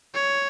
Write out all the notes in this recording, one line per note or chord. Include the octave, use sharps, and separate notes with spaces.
C#5